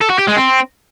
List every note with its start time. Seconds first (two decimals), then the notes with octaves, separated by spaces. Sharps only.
0.01 A4
0.10 F#4
0.19 G4
0.28 G#3
0.37 C4